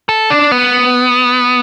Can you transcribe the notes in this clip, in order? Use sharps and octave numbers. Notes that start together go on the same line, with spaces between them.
A4
D4
B3